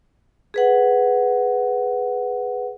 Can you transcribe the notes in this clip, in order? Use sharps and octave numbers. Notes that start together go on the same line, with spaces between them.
G#4 B4 F#5